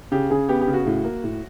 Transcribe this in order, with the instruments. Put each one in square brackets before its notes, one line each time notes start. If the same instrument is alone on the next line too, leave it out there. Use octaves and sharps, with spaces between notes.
[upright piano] C#3 G4
C#3 G#4
B3 G4
G4
C#3
F#4
A2
A#3
A2